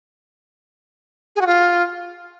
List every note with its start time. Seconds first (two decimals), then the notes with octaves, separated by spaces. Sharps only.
1.36 G#4
1.41 F#4
1.47 F4